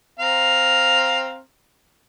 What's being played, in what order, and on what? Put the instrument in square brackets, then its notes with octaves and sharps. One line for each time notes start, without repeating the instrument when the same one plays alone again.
[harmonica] C4 F5 A#5